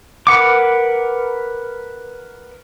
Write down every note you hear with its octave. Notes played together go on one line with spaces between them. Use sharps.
A#4 B4 F#5 D6